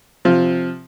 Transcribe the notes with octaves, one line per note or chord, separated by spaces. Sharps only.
C3 F3 F4